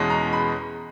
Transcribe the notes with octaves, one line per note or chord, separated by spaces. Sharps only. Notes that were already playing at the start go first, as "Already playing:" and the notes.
Already playing: E2 B2 G#3 C#4
A#5
B5